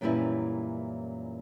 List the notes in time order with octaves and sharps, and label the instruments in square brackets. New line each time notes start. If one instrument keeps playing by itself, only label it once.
[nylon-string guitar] F#2 A#2 E3 G3 C#4 E4